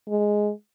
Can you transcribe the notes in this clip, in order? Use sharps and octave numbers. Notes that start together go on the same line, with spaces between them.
G#3